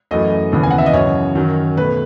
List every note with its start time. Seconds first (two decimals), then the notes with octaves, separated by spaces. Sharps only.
0.11 F#2 E3 A3 D#5
0.52 D#2 C#3 E3 B3
0.63 G#5
0.71 F#5
0.78 E5
0.86 D#5
0.94 F#2 C#3 E3 C#5
1.35 F#2 D#3 F#3
1.77 B2 A3 B4